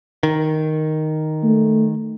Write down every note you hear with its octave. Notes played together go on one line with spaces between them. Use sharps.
D#3
A3